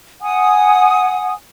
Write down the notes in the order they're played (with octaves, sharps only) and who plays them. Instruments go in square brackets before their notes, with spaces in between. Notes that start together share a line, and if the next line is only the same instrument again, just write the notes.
[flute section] F#5 G#5 D#6